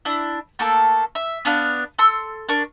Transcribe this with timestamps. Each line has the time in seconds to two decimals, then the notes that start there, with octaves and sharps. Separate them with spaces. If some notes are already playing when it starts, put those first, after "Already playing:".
0.05 D4 E4
0.59 A3 A#3 A4
1.15 E5
1.45 B3 D4 F5 F#6
1.99 A4 C6 E6
2.49 D4 A#4 C#6